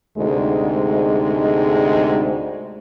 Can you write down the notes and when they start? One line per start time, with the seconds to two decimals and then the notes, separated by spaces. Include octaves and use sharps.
0.18 D2 G#2 C3 G#3